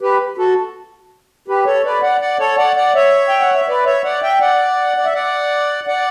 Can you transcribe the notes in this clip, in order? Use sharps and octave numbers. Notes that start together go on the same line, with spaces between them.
G4 B4
F#4 A4
G4 B4
A4 C#5
B4 D5
D5 F#5
D5 F#5
A4 C#5
D5 F#5
D5 F#5
C#5 E5
G5
F#5
E5
B4 D5
C#5 E5
D5 F#5
E5 G5
D5 F#5
D5
E5
D5 F#5
D5 F#5